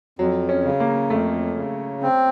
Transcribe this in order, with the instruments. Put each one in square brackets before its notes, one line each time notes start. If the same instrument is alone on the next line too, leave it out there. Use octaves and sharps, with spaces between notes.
[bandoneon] F2 [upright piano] F#3
[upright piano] C#4
[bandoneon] C#3
[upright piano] A#3
[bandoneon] F2 [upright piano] A3
[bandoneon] C#3
C4